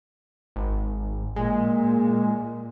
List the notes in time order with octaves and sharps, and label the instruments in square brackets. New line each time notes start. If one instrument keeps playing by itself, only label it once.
[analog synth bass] G#1
[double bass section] A#2 [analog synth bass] G#3